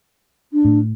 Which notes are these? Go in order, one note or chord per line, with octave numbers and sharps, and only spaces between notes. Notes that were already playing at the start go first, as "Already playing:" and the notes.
D4
A2